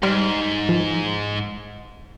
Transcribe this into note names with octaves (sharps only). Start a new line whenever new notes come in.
G#2 G3 C6 F6
F3